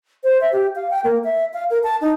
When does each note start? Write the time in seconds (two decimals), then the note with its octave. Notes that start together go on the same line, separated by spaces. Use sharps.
0.24 C5
0.41 E5
0.53 G4
0.76 F5
0.91 G5
1.04 A#3
1.24 E5
1.54 F5
1.70 A#4
1.84 A5
2.01 D#4